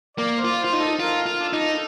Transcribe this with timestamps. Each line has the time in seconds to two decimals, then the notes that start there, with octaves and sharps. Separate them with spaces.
0.17 A#3 D5
0.37 C5
0.45 F4
0.59 C5
0.64 F4
0.73 D#4
0.79 A4
1.00 F4 A#4
1.26 F4
1.40 D4 A4
1.53 D#4
1.73 A4